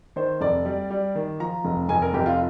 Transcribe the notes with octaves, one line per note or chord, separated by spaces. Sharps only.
D#3 C5
F1 D5
G3
G3
D#3
F3 A#5
F1
F1 G#5
A#4
F1 G4
F4